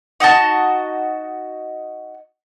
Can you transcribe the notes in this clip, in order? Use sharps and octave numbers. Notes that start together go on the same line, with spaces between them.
D#4 F#4 D#5 A5